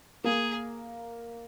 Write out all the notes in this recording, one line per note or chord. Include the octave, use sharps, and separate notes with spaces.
A#3 G#4